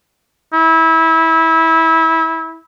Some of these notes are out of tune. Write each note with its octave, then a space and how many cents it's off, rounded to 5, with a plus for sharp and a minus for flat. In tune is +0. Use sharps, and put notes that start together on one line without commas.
E4 -25